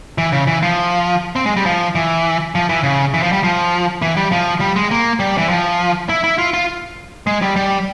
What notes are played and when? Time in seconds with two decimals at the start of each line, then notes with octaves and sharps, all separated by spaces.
0.18 E3
0.32 C#3
0.47 E3
0.62 F3
1.36 C4
1.46 G#3
1.57 G3
1.66 F3
1.95 E3
2.55 F3
2.69 E3
2.84 C#3
3.14 E3
3.23 F3
3.33 G3
3.43 F3
4.02 E3
4.17 G3
4.32 F3
4.60 G3
4.76 G#3
4.91 A#3
5.20 G3
5.38 E3
5.49 F3
6.09 E4
6.24 E4
6.38 F4
6.54 F4
7.27 G#3
7.42 G3
7.56 G3